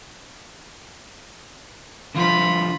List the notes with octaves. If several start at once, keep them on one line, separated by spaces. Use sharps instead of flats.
D3 F3 E4 F4 B5